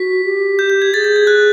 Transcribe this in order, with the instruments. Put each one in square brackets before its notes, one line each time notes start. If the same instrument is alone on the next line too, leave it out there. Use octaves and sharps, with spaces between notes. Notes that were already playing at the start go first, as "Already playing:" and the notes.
Already playing: [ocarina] F#4 [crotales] B6
[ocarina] G4
[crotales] G6
G6
G#6
[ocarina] G#4 [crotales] A6
[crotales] A6
G#6
F#6